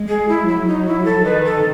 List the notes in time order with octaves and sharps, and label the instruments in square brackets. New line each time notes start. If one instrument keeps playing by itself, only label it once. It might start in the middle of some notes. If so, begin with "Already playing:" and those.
Already playing: [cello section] G#3
[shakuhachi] G#4
E4
[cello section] F#3 [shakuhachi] E4
[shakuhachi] D#4
E4
A4
[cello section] D#3 [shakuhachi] B4
[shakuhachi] A4